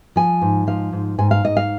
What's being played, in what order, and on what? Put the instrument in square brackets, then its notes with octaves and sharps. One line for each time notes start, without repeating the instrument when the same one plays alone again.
[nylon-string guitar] F3 G#5
G#2
F3 F5
G#2
G#2 G#5
F5
G#2 D#5
F5